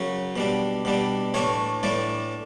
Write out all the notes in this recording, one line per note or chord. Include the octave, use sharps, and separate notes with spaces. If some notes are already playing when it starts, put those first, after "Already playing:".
Already playing: F#2 C#3 F#3
B2 G3 D4
B2 G3 D4
A2 E3 A3 D4 C#5
A2 E3 A3 D4 D5